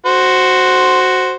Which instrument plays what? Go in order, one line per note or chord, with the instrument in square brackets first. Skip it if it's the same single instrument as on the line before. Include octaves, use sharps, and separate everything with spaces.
[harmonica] F#4 C5